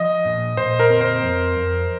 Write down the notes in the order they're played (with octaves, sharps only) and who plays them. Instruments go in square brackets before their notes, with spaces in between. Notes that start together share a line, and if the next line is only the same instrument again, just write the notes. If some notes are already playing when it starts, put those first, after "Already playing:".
Already playing: [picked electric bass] F3 [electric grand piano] D#5
[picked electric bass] A#2
[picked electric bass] A#2 [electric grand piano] C5
[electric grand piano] A#4
[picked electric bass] C4
[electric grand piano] C5
[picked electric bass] F2
F2